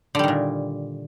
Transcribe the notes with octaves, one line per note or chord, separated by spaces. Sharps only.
A#2 D3 D#3 G3